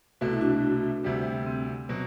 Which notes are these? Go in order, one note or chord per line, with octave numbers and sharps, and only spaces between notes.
C2 B2 A3 F#4
E4
D4 F#4
D2 C3 G3
C4
B2 F#3